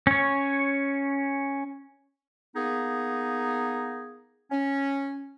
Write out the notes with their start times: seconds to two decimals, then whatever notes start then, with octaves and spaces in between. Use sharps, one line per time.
0.07 C#4 C#5
2.56 A#3 B3 D#4 G#4
4.51 C#4